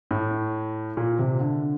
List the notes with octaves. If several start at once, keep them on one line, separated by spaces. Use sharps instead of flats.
A2
A#2
C3
D3